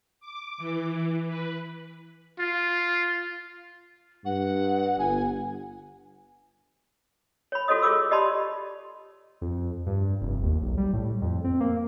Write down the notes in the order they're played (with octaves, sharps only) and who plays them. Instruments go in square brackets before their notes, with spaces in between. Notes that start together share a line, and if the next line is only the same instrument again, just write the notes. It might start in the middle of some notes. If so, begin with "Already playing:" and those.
[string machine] D6
E3
B4
[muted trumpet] F4
[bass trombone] G2 [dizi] F#5
[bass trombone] G1 [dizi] G#5
[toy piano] C#5 B5
F4 F#4 A4 C#5 D#5 D#6
F4 G#4 A4 C#5 D6 E6
G4 D5 D#5 A5 B5 C6
[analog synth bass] F2
G2
F1
D#2
B1
G3
A2
F2
C4
A#3